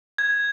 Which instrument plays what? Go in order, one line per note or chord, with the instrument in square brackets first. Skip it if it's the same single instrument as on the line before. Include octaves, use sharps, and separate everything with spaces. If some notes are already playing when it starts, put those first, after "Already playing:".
[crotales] G#6